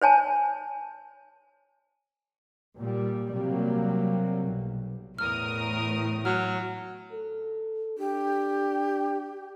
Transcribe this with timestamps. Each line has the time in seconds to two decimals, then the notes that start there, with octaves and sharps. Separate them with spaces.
0.02 C5 C#5 G#5 A5
2.79 A#2 G3
3.34 C3 F#3 G3 A#3
4.45 B1
5.18 E2 A2 A#4 D#6 F6
6.25 F#3 F6
7.13 A4
7.98 D4 G4